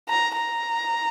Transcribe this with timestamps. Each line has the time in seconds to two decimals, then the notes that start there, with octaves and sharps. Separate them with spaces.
0.09 A#5
0.37 A#5